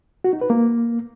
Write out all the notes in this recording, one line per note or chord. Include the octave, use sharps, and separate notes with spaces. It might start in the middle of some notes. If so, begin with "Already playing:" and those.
F#4
D#4
B4
A#3